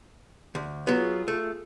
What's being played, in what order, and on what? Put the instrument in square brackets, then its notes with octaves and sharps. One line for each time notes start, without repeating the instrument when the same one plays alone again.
[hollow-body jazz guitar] D2
[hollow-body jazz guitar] F#3 B3 [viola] F4 G#4
[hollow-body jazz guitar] A3